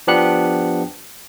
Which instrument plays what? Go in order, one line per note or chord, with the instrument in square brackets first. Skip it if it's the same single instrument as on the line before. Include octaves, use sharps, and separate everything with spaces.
[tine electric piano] F3 B3 D4 G4 F#6 C#7